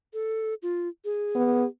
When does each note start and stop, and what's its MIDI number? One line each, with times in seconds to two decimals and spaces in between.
0.13 0.54 69
0.62 0.88 65
1.05 1.67 68
1.35 1.64 59